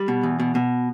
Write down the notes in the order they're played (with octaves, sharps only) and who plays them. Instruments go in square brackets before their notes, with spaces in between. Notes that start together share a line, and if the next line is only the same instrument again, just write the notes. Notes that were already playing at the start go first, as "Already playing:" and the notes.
Already playing: [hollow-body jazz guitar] G3
B2
E2
B2
B2